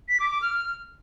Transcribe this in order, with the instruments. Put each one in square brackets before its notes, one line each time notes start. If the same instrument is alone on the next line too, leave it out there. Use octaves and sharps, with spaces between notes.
[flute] B6
D6
D6
F6
F6